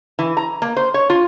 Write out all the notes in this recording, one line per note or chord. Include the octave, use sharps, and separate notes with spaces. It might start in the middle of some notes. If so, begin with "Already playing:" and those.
E3
A#5
A#3
C5
C#5
F4